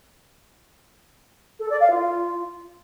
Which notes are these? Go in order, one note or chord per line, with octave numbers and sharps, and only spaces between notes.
A4
D5
F5
F4